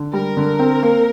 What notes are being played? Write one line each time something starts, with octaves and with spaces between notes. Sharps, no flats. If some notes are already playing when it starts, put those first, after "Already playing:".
Already playing: D3
G3 A#4
D3
C4
A#3